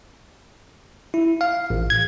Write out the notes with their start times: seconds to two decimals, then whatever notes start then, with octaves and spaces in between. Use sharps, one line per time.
1.14 E4
1.41 F5
1.70 A1
1.90 G#6